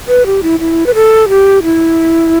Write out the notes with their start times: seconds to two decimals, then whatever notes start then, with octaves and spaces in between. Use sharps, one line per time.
0.08 B4
0.26 G4
0.43 E4
0.60 E4
0.86 B4
0.95 A4
1.29 G4
1.63 E4